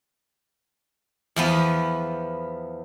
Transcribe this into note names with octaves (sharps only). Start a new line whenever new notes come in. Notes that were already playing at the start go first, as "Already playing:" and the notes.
E2 F3 B3